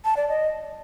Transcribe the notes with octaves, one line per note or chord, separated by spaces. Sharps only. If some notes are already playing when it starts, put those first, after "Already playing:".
A5
D5
D#5